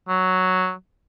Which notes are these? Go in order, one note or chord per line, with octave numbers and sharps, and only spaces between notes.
F#3